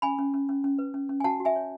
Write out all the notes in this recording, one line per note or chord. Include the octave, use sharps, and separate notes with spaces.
C#4 G#5 B5
C#4
C#4
C#4
C#4
B4
C#4
C#4
G#5
F#4 F#5 A5
F#4
E5 G#5
C#5